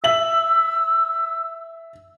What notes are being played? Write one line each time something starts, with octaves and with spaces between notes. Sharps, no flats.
E5 E6 F#7